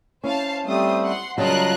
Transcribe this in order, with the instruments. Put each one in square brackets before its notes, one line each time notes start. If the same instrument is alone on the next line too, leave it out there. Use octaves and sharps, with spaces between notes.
[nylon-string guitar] C#4 E4 [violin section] C5 F5 A5
[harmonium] G3 A3 C4 [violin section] C5 D#6
[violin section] F#5 C6
[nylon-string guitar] C#3 F#3 G3 [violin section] F4 A#4 F#6 [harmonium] D#5 A5